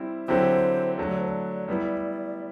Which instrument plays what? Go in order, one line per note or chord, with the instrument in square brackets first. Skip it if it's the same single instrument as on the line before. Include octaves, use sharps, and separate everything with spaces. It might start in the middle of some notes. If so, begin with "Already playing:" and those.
Already playing: [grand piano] G3 C4 E4
[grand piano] D3 F#3 C4 E4 G4 [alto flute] C5
[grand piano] D3 F#3 A3
[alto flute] D5
C5
D5
[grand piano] G3 B3 E4 [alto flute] D5